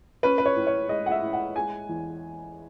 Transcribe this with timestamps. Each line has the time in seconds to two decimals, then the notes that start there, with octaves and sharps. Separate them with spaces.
0.23 C#4 B4
0.38 B4
0.46 C#5
0.56 A2
0.67 C#5
0.89 G#3 D#5
1.06 F#5
1.12 E5
1.22 A2
1.33 F#5
1.56 G#3 G#5
1.89 E2